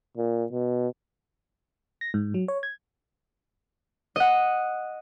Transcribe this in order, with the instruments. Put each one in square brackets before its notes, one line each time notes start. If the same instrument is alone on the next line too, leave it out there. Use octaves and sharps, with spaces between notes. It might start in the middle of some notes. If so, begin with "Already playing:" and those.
[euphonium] A#2
B2
[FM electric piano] A#6
G#2
F#3
C#5
G#6
[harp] D#5 F#5